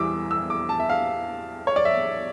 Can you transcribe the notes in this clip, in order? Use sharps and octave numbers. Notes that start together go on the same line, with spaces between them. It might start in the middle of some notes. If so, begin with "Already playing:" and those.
Already playing: E2 E3 G3 D6 E6
E6
D6
A5
E5
F5
C#5
D5
E5